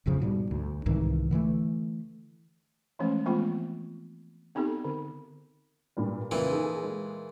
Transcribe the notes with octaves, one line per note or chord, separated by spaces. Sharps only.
G#1 E2 C#3 F3
G#2 B2 F#3 G3
D2
C2 G#2 D#3 E3
D3 E3 G3 A3
E3 F3 G#3 A3 C#4
E3 G#3 A3 B3 C4 F4
B3 C4 D#4 G4 A4
D3
G2 A#2 G3
F2 A#2 C#3 E3
D#4 G#4 A4
G#3